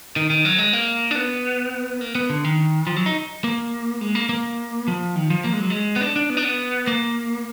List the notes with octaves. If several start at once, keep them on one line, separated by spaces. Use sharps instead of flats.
D#3
D#3
F#3
G#3
A#3
D4
B3
A#3
B3
D3
D#3
F3
F#3
D#4
A#3
G#3
A#3
A#3
F3
D#3
F3
A#3
G#3
F#3
G#3
B3
D4
D4
B3
D4
B3
A#3